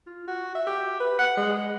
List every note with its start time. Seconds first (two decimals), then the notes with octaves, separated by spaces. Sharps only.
0.07 F4
0.28 F#4
0.55 E5
0.67 G4
1.00 B4
1.19 F#5
1.37 G#3